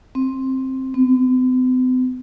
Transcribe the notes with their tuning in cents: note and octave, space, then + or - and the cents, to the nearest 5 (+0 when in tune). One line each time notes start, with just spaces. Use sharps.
C4 +10
C4 -45